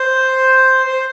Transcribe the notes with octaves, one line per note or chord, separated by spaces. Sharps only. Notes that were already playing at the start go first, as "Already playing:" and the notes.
Already playing: C5
C5